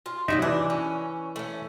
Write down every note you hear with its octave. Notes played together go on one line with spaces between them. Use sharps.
F4
C3 F#3 D#4 F#4 D5 E5
E3 D4
C#4
A3 C#4